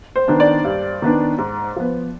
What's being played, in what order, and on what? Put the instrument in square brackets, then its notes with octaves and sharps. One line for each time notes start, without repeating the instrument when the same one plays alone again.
[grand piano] C5
[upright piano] D#3 B3 D4
[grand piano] D5
[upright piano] G2
D#3 B3 D4
G#2
F3 B3